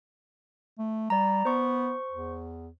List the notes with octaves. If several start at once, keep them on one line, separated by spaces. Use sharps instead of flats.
A3
G3 D5 A#5
B3 C5 C#6
E2